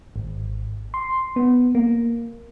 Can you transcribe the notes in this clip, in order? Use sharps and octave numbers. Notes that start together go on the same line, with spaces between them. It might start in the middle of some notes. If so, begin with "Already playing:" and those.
G#1
C6
B3
A#3